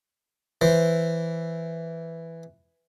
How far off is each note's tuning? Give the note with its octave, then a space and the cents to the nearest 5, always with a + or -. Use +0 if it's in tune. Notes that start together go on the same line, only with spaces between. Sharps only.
E3 +0 C5 +0